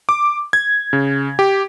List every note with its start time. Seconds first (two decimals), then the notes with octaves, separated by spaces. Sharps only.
0.09 D6
0.53 G#6
0.93 C#3
1.39 G4